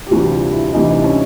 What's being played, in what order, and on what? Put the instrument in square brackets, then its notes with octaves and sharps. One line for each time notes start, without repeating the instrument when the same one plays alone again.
[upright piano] G4
D2 C3 E3 G3 F#4
F4
E4
D2 C3 E3 G3 D#4
D#4
C#4